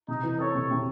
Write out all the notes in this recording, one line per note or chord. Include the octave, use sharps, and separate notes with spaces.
C3 D#4
E3
C4 A4 C#5
C3
C3